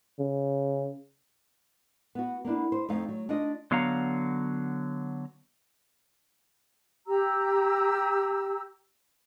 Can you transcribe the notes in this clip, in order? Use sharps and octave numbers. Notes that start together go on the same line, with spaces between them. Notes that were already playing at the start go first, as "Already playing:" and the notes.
C#3
B3 F#4
A#3 B3 D4 E4
C5
F2 A3 D#4 F5
F#3
D4 D#4 F4 D#5
D3 F#3 B3 F5 F#5 A#5
G4 A#5 E6